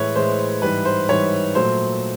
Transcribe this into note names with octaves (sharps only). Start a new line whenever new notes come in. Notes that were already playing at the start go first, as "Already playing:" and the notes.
Already playing: A2 E3 G#3 B4 C#5
A2 E3 G#3 C5
G#2 E3 G3 B4
C5
G#2 E3 G3 C#5
A#2 F#3 A3 C5